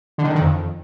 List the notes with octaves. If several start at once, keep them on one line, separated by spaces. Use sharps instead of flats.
D3
D#3
D3
D#3
F2